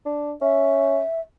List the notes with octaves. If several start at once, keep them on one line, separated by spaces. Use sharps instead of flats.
D4
C#4 E5